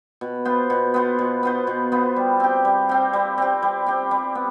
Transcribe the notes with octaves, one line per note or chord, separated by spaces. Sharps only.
B2
B3 F4 C5
B2
B3 F4 C5
B2
B3 F4 C5
B2
B3 F4 C5
G3
C4 G4
G3
C4 G4
G3
C4 G4
G3
C4 G4
G3
B3